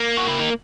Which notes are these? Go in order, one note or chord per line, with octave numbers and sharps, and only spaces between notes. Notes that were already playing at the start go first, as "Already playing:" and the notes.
Already playing: A#3
F#4
E4
D#4